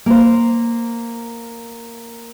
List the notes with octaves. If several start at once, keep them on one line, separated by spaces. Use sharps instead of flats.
A#3 C5